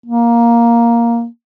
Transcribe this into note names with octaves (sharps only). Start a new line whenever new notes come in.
A#3